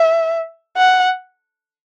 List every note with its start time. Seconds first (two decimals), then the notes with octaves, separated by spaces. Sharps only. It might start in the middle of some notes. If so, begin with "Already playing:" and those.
Already playing: E5
0.77 F#5